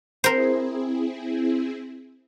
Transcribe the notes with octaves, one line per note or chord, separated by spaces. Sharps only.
C4 E4 G#4 A#4 C5